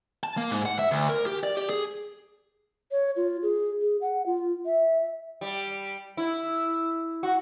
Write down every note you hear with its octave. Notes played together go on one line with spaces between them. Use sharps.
A5
A#3
G#2
F#5
E5
D2
A#4
G4
D5
G4
G#4
C#5
F4
G#4
G#4
F#5
F4
E5
E5
G3
E4
F#4